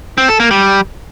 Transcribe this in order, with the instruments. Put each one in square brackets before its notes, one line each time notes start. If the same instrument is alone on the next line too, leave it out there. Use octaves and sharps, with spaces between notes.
[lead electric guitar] C4
A4
A#3
G3